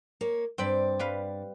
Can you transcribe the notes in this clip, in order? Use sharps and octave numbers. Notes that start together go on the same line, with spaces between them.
A#3 C#5
G2 C4 D5 G5 B5
G3 B4 F5